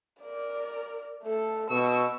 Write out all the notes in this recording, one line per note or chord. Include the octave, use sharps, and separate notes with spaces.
A#4 D5
A3 A4
B2 C#6 E6